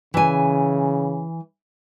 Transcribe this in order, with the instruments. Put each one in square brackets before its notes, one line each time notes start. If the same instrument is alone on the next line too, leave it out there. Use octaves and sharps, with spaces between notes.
[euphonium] C#3 [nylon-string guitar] E3 G#5